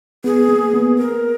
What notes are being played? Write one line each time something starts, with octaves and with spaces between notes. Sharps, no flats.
B3 G#4
A#3
B3
A#4